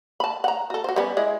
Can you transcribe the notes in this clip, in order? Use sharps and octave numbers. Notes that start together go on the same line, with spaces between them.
A5 B5
F#5 A#5
F#4 A4
F#4 C5
G3 B3 C#4
G#3 E4 D5